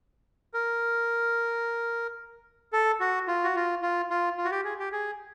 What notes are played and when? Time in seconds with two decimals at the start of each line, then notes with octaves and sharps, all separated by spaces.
0.54 A#4
2.73 A4
3.00 F#4
3.28 F4
3.44 F#4
3.56 F4
3.82 F4
4.10 F4
4.37 F4
4.45 F#4
4.51 G4
4.64 G#4
4.79 G4
4.92 G#4